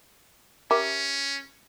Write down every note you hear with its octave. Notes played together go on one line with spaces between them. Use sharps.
C#4 G4 A#4 E5